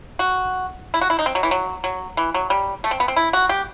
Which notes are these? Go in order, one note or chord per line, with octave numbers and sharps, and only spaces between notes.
F#4
E4
F#4
E4
D#4
C4
F#3
E3
F#3
F#3
E3
F#3
G3
A3
C4
B3
C4
E4
F#4
G4